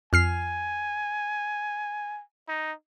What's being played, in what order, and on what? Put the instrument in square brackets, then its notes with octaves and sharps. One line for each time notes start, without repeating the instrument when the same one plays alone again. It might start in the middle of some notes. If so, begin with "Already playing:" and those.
[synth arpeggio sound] F2 F6 C7 [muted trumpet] G#5
[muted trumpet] D#4